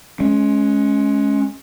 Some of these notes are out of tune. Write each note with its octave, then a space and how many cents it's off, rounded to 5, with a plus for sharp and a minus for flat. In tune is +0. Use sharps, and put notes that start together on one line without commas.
G#3 +25 C#4 +0